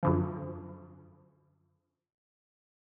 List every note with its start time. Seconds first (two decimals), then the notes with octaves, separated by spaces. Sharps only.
0.03 F#2 D3 F3